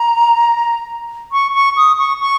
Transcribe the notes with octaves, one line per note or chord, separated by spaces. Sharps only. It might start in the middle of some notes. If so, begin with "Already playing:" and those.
Already playing: A#5
C#6
C#6
D#6
C#6
C#6